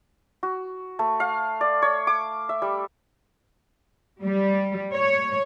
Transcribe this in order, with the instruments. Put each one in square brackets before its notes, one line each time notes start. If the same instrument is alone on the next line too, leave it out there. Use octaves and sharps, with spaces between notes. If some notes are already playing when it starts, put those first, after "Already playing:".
[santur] F#4
A3
F5
D5
C#5
D6
E5
G3
[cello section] G3
C#5